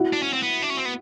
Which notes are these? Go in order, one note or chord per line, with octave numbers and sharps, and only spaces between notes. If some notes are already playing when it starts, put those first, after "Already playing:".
Already playing: E4 F#4
D4
C#4
C4
B3
D4
C#4
C4
B3